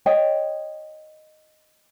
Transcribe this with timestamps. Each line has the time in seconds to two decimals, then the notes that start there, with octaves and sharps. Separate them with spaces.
0.06 C#5 D#5 G5